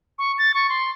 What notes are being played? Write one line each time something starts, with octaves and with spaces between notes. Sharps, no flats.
C#6
A6
C#6
C6